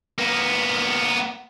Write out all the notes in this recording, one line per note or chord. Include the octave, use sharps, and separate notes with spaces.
A#3 B3